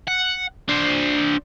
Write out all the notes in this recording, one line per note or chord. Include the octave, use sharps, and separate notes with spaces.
F#5
D4 C5